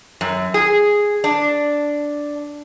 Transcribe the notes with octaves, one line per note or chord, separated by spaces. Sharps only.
F#2
G#4
D4